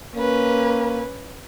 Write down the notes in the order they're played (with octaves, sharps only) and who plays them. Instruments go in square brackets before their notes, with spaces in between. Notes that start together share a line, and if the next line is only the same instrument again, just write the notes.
[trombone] A#3 [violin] C#4 B4